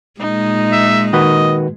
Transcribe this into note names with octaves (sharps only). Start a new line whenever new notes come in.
A#2 G#3 D#4
E5
D#3 F#4 B4 D#5